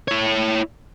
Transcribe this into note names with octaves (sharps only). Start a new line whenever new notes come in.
E4 C#5